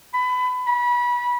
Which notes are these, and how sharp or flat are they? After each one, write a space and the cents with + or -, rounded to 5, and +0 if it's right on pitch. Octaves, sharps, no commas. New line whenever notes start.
B5 +25
B5 -25